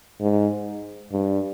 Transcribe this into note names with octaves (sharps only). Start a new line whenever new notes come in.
G#2
G2